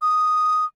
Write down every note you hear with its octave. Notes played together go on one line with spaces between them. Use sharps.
D#6